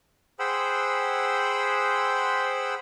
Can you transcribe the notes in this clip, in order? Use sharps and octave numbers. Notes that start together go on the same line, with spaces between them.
G#4 C5 F#5 G5 B5 E6